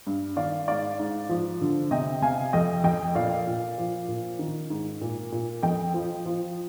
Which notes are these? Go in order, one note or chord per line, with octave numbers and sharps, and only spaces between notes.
G2
D#3 D5 F5
G#2 D5 F5
G#2
F3
D3
C3 D#5 G5
C3 F5 G#5
F2 D#5 G5
F2 D#5 G5
A#2 D5 F5
A#2
F3
A#2
D#3
G#2
A#2
A#2
F2 D#5 G5
F3
F3